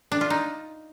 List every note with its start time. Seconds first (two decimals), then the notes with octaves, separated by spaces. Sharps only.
0.12 D4
0.21 F4
0.30 D#4